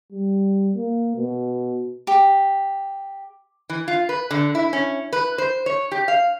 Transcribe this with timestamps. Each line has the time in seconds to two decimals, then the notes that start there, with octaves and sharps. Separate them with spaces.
0.12 G3
0.74 A#3
1.17 B2
2.07 G4
3.70 E3
3.88 F4
4.09 B4
4.31 D3
4.55 E4
4.73 C#4
5.13 B4
5.38 C5
5.66 C#5
5.92 G4
6.08 F5